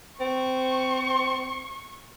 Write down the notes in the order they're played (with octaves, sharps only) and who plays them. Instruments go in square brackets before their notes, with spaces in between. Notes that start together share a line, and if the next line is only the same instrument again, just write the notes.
[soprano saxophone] C4 [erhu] C#6